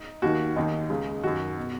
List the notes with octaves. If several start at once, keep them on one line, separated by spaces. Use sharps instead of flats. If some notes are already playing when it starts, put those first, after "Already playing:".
Already playing: D#4
D#2 D#3 F#4
D#2 D#3 D#4
C#2 C#3
F#2 D#3 F#4
B2